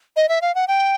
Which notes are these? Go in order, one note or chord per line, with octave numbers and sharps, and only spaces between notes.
D#5
E5
F5
F#5
G5